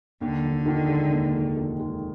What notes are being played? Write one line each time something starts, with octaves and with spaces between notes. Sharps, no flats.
D#2 D3
F1
D#3
G#3
D#2
F1
D#3
G#3